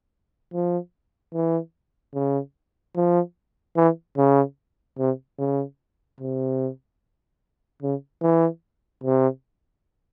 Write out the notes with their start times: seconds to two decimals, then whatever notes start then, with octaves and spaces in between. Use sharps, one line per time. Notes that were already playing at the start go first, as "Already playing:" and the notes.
0.53 F3
1.34 E3
2.14 C#3
2.96 F3
3.76 E3
4.17 C#3
4.99 C3
5.39 C#3
6.20 C3
7.82 C#3
8.22 E3
9.03 C3